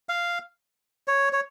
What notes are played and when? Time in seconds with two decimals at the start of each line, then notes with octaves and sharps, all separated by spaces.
0.09 F5
1.08 C#5
1.33 C#5